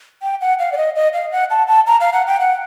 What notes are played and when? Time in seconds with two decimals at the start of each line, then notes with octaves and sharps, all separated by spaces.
0.22 G5
0.41 F#5
0.59 F5
0.72 D5
0.77 D#5
0.95 D#5
1.13 F5
1.32 F#5
1.50 A5
1.68 A5
1.87 A#5
2.00 F5
2.13 F#5
2.27 G5
2.40 F#5